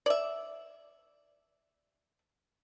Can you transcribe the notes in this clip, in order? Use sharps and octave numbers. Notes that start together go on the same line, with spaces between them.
D5 E5